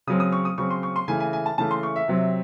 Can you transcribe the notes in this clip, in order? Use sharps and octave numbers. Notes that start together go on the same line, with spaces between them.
C#3 F#3 C4 D#6
D#6
C#6
D#6
C#3 F#3 C4 C#6
C6
C#6
C6
C#3 E3 A3 G#5
G#5
G#5
A5
C#3 E3 A3 A5
C6
C#6
E5
C3 F#3 C4